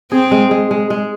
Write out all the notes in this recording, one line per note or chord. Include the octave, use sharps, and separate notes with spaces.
C4 G#4
G#3
G#3
G#3
G#3